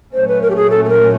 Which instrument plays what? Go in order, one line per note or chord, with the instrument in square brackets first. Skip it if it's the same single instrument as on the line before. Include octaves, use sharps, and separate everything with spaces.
[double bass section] A#2 F#3 A3 C#4 [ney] C5
[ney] B4
A#4
G4
G#4
A4
A4
A#4